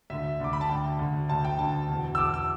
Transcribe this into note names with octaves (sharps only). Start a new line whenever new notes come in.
D2 D3 E5
D2 D3 D6
B5
A5
D2 D3 G5
D2 D3
D2 D3 A5
G5
D2 D3 A5
E2 B2
E6
E2 B2 D6
E6